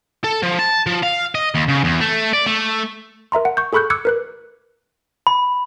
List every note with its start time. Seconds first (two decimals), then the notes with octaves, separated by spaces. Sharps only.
0.24 A4
0.43 F3
0.59 A5
0.87 F3
1.03 F5
1.35 D#5
1.55 D#2
1.68 C#3
1.84 E2
2.01 A3
2.33 D5
2.46 A3
3.32 A#4 E5 A#5 C6
3.45 F#5
3.57 C#6 G6
3.73 G#4 A4 B5 C#6 F#6 G6
3.90 D6 E6 F#6 G#6 C#7
4.05 A#4 B4 F#6
5.27 B5